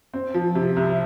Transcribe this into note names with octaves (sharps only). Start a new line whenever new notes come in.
C4
F3
C3
C2